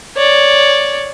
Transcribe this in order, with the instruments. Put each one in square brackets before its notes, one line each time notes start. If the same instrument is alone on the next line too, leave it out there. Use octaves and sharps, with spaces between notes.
[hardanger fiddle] C#5 D5